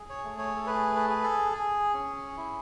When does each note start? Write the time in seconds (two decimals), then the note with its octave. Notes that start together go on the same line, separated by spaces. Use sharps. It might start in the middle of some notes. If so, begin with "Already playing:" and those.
Already playing: G#4
0.09 C#5
0.24 A3
0.38 C#5
0.56 A4
0.66 G#4 B4
0.96 B4
1.10 G#4
1.24 A4
1.52 G#4
1.94 C#4
2.37 E4